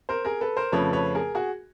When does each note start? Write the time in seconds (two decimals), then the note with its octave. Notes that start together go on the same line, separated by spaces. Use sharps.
0.09 A#4 C5
0.25 G#4 A#4
0.41 A4 B4
0.57 A#4 C5
0.72 F2 C#3 F3 A3 B4 C#5
0.93 B4 C#5
1.15 G#4 A#4
1.35 F#4 G#4